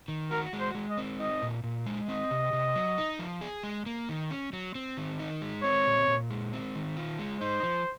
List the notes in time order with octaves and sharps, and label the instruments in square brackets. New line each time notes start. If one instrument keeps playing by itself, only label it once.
[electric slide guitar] D#3
[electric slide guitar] F#4 [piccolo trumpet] A#4
[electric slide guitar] G#3
[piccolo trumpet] C5
[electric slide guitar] G#3
[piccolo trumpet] D#5
[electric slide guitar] C4
[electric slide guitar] D#4 [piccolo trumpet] D#5
[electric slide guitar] A#2
A#2
G#3
[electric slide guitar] C4 [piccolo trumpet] D#5
[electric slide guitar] C3
C3
F#3
D#4
F3
G#4
G#3
A#3
D#3
C#4
F#3
C4
D#3
D#4
G#3
[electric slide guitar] C4 [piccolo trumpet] C#5
[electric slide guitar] A#2
A#2
G#3
C4
D#3
F4
G#3
[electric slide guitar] D#4 [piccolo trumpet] C5
[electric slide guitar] F3